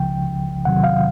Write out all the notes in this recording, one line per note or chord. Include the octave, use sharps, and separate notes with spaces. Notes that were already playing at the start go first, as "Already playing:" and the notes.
Already playing: C#2 C#3 F3 G5
E2 C3 D#3 F#3 F#5
F5